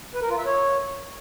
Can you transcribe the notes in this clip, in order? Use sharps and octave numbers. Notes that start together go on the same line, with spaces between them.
B4
A#4
F4
E5
C#5